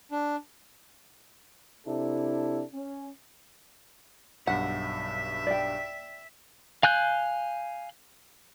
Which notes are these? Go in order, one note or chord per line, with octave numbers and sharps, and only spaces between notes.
D4
C3 D4 E4 A4
C#4
B1 G2 E5 F#5
D5 G5
F5 G#5 F#6 G6